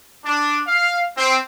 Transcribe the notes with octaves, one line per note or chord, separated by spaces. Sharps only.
D4
F5
C4